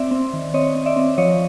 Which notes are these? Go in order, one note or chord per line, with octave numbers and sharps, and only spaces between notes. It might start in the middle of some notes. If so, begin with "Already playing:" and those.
Already playing: C4 D5 E5
C4
D#3
C4 C#5 D#5
C4
D5 E5
C4
F3 C#5 D#5